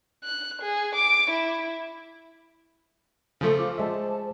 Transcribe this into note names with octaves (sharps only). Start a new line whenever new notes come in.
F#6
G#4
D6
E4
C#3 F3 A3 A4 C5
F4 D6
G#3 C5 D5 E5 A5